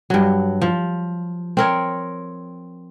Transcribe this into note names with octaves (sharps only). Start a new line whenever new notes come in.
G2 F#3
F3
C4 A#4 C#5